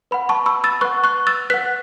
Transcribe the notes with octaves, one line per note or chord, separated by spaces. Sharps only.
B4 F#5 B5
A5 C#6
B5 E6
E6 A6
B4 F#5 C#6 F#6
C#6 F#6
E6 A6
B4 F#5 F#6 B6